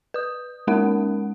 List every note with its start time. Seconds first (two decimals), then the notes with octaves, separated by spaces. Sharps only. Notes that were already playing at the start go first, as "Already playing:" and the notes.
0.14 B4 D#6
0.67 G#3 A#3 C#4 D#4 A#4 F#5